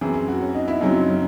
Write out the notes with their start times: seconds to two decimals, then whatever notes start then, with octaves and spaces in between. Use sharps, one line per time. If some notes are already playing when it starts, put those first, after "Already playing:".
0.01 F#2 E3 C4 G#4
0.14 G#4
0.28 F#4
0.41 C#4
0.55 D#4
0.68 E4
0.81 F#2 C#3 F#3 C4 D#4
0.95 C#4
1.08 C#4